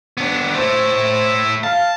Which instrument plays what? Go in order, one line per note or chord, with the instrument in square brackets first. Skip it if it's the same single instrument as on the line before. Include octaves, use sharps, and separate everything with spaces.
[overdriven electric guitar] B3 D4
[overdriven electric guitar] A3 E4 [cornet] C5
[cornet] F5 [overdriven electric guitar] A5